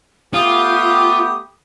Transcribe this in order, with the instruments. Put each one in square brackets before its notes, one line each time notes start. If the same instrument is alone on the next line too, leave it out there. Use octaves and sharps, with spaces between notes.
[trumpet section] A3 B3 G4 [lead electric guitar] F4 [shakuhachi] D#6